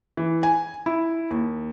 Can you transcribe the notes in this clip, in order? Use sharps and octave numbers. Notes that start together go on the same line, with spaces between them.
E3
G#5
E4
D#2